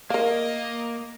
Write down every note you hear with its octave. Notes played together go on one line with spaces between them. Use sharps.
A#3 A#4 D#5 F5